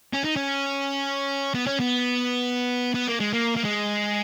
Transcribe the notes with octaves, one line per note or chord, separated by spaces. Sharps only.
C#4
D#4
C#4
B3
C#4
B3
B3
A#3
G#3
A#3
A#3
G#3